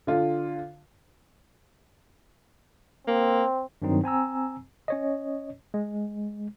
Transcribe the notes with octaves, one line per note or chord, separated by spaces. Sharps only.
D3 F4
A#3 C4
G2 D#3 F#3 C4 D#4
C4 G#5 A#5 E6
C#4 C#5 D#5
G#3